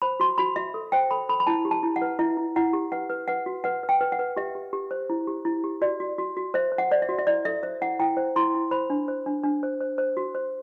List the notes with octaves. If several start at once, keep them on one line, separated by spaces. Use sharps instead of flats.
C5 B5
F#4 C6
F#4 B5
F#4 E5
A4
C5 G5
A4 B5
A4 B5
B5
E4 A5
G4
A5
E4
F#5
B4
E4 E5
E4
E4 F#5
G4
B4 F#5
B4
B4 F#5
F#4
B4 F#5
B4
G5
B4
F#5
B4
G4 E5
G4
G4
C5
E4
G4
E4
G4
F#4 D5
F#4
F#4
F#4
C5 E5
C5
F#5
C5 D5
E5
F#4
E5
E4 D5
A4 E5
C5 E5
E4 F#5
E4 G5
C5
E4 C6
E4
C5 B5
D4
C5
D4
D4
C5
C5
C5
F#4
C5